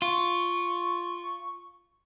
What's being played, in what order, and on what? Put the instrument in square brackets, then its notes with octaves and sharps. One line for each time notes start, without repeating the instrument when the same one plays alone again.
[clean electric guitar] F4 [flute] C#6